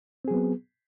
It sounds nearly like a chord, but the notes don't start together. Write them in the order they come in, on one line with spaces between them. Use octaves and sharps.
C4 G#4 F#3 B3